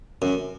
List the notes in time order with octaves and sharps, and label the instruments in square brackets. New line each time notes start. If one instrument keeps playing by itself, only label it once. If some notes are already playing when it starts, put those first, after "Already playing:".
[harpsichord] F#2